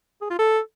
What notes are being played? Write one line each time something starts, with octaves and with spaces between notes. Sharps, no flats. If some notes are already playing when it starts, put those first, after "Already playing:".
G#4
F4
A4